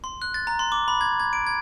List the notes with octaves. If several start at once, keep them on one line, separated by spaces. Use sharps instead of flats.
C6
F#6
A6
A#5
C6
D6
B5
G#6
G#6
D7
G#6